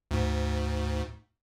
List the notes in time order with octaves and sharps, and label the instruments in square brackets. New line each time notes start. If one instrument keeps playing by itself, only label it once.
[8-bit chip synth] D2 G#2